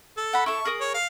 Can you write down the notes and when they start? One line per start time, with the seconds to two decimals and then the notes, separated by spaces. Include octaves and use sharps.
0.17 A4
0.33 F#5 B5
0.46 E4 A4 C#6
0.65 G#4 A#4 D#6
0.80 C#5
0.94 F5